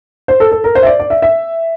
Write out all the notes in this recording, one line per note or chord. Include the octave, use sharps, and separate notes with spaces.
C5
A4
A4
A#4
C5
E5
D5
D5
E5
E5